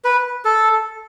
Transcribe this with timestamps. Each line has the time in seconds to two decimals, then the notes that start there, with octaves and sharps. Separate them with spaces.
0.04 B4
0.45 A4